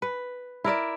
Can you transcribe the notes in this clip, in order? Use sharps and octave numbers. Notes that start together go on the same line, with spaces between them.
B4
E4 A#4 D5 E5